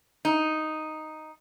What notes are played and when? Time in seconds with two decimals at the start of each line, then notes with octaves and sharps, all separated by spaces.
0.25 D#4